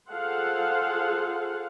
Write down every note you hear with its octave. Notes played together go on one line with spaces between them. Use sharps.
F4 G#4 A4 C5 F5 F#5